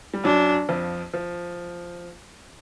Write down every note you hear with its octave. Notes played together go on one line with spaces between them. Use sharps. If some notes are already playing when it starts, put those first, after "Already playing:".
G3
F#2 F#3 D4
F2 F3
F3